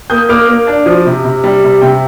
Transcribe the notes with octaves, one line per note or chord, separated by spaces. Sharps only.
A#3 D#6 G6
A#3 D6 F6
A#3
D4
F3
C3
C3
G3
C3
C3 G5